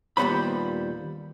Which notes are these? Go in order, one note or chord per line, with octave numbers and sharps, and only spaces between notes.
D#2 A#2 G3 B3 C5 B5